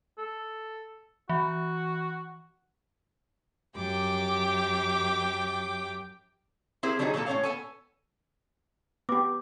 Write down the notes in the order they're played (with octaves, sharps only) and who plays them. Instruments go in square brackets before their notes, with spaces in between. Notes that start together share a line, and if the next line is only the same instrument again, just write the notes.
[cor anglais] A4
[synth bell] E3 [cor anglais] F#4
[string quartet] F#2 G4 G5 D6
[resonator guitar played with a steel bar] C4 E4 G4 G#4 A#4 C5
D3 F#3 G3 D4 D#4 G#4
A#2 E3 G3 A#3 A4
A2 C#4 C#5 F5
B3 A4 G#5
[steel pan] B3 G4 [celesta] D6